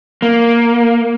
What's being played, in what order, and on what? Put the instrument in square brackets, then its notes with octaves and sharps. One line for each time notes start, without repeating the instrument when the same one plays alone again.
[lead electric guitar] A#3